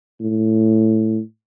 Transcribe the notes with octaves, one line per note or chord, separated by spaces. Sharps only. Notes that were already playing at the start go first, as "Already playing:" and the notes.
A2